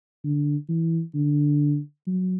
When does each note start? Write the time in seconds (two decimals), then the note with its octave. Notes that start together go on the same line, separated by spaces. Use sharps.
0.24 D3
0.69 E3
1.15 D3
2.07 F#3